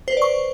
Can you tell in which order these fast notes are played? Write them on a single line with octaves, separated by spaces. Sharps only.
C5 B4 D5 C#6